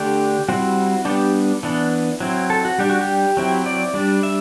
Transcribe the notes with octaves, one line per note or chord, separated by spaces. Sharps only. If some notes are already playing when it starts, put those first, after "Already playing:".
Already playing: D3 A3 D4 G4
G3 C4 E4 F#4
G3 B3 D4 G4
E3 B3 D4
F#3 C4 E4
A4
F#4
G3 D4 G4
F#4
G4
F#3 C4 E4
D5
G3 D4
E5